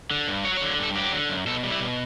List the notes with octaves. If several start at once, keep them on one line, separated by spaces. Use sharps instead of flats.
D3
G2
F#3 C#5
C#5
D3
G2 A4
F#3 G4
D3
F#2
B2 A4
G3
E4
B2